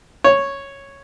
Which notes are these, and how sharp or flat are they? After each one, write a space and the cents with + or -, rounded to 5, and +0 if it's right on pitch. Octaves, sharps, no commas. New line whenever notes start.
C#5 -5